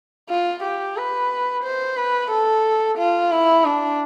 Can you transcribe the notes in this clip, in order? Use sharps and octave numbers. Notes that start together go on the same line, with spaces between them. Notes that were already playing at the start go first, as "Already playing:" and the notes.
F4
G4
B4
C5
B4
A4
F4
E4
D4